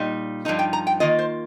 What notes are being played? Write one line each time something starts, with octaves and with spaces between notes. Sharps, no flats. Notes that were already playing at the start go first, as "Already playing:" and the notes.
Already playing: A#2 G3 D#4
G2 F3 D#4 A#5
G5
A#5
G5
D#3 A#3 F4 D#5
C5